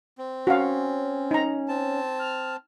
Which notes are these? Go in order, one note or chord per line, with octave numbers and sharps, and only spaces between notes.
C4
C#4 F#4 F5
D#4 A#5
C4 A5
F6